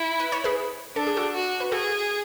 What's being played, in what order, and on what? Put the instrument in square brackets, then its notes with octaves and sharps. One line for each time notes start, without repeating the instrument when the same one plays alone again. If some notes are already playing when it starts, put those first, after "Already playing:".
Already playing: [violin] E4
[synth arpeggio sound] B4
C#5
G#4 B4
[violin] D4 [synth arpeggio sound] A4
[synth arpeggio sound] G#4
F#4 A4
[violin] F#4
[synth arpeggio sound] B4
[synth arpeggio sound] F#4 A4 [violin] G#4